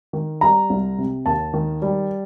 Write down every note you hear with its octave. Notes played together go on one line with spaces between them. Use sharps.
D#3
G3 A#5
C2
C3
D#2 A5
D#3
G3